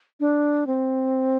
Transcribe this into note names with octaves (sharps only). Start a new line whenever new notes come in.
D4
C4